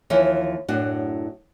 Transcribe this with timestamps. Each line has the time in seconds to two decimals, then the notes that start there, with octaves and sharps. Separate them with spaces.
0.10 D#2 E3 F3 C#5 E5
0.68 F#2 A2 D4 F#4